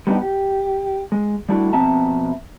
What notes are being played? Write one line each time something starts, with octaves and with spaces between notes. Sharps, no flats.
G3 B3 D4 D#4 G4
G4
G#3
G3 A3 D4 E4 F#4
F2 B2 C4 E5 A5 A#5